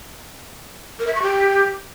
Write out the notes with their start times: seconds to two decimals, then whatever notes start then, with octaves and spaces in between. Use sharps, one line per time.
0.99 A#4
1.07 E5
1.15 C#6
1.22 G4